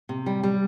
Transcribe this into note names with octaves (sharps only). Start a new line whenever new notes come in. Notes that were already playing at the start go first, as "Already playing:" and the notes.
C3
G3
G3